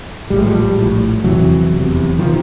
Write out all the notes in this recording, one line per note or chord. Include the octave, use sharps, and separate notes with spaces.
A#1 A2 G3
G#3
F3 G3
A#1 A2
F1 E2 C3 E3 F#3
F1 E2 C3
C3 D#3 F3